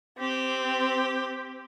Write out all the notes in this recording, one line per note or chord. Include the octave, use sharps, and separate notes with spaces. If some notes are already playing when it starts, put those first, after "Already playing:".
C4 G4